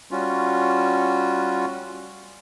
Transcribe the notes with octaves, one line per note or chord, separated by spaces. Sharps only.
G3 C#4 F4 F#4